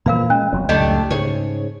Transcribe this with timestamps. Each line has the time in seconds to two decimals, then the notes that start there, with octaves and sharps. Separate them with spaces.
0.06 A#2 E3 F3 A#4 F5 B5
0.30 G#3 C#4
0.53 E1 F2 F#3
0.69 C#2 F#2 A2 A3 D4 G4 D#5
1.11 G#2 C#3 G#4 C#5